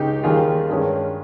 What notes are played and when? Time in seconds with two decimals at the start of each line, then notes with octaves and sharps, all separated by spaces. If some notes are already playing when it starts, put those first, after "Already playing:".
Already playing: C#2 C#3 G#3 D#4 G4
0.24 D#2 D#3 G3 A#3 F4 G#4
0.69 G2 D#3 G#3 C#4